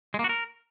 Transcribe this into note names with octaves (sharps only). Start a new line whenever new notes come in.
G#3
A#3
F#4
A#4